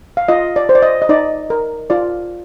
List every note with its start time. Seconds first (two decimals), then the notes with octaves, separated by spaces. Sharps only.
0.17 F5
0.28 F4 D#5
0.56 D5
0.69 C5
0.75 D5
0.82 D#5
1.02 D#5
1.09 D#4 D5
1.50 A#4
1.90 F4 D5